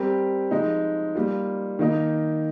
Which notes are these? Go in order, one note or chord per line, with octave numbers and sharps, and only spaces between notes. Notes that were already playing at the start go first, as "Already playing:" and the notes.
Already playing: G3 C4 G4 A#4
F3 G#3 D#4
G3 A#3 F4
D#3 A#3 D#4 A#4